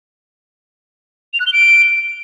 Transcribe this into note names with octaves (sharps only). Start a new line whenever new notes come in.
F7
F#6
G7
D7